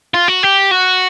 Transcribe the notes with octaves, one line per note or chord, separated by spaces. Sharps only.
F4
F#4
G4
F#4